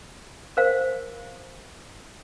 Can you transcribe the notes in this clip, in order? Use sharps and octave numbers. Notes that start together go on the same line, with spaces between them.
A#4 C5 F5